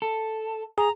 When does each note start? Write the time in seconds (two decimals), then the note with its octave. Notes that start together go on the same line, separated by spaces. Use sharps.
0.02 A4
0.78 G#4 A#5